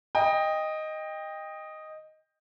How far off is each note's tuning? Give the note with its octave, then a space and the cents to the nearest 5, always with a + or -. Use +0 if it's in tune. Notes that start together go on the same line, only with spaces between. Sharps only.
D#5 +0 G5 +20